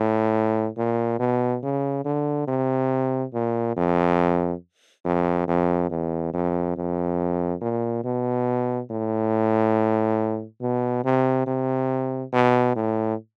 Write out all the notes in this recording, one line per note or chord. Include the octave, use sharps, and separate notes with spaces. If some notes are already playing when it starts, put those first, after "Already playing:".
Already playing: A2
A#2
B2
C#3
D3
C3
A#2
F2
F2
F2
E2
F2
F2
A#2
B2
A2
B2
C3
C3
B2
A2